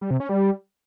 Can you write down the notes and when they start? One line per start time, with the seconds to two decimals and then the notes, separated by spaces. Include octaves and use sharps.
0.01 G3
0.11 C3
0.20 C#4
0.29 G3